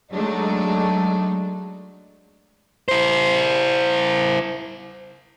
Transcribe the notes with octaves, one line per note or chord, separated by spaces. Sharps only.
F#3 G#3 A3 D4 D#4
E4 C5